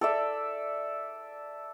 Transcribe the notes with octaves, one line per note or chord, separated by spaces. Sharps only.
A4 D5 E5